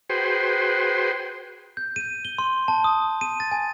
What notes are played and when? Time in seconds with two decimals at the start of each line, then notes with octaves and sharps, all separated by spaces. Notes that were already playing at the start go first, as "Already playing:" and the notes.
0.10 F#4 G#4 B4 C5 G5 C6
1.77 G6
1.96 D#7
2.25 G7
2.39 C6
2.68 A5
2.84 D#6
3.21 D#7
3.40 A6
3.51 G#5